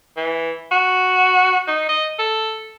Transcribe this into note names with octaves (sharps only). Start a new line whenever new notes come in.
E3
F#4
D#4
D#5
A4